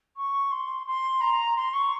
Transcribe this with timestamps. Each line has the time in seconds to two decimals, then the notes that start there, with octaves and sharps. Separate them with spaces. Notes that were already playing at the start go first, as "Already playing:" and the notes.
0.16 C#6
0.51 C6
0.86 C6
1.21 A#5
1.56 C6
1.73 C#6